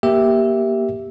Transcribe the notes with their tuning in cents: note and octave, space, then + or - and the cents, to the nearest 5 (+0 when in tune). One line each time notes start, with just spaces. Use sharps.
A#3 +15 G4 +0 E5 +0